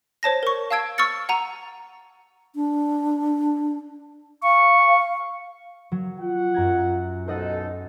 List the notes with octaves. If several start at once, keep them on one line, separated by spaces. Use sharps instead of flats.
C5 C#5 A5 A#6
A#4 C#6
F5 A5 E6 G#6 D7
C#6 E6 F6 A6 C#7
F#5 A#5 D#7
D4
F5 C#6
F#3
F4 F#5
F#2 A#5 G#6
B1 D#4 A4 C5 D#5 F#5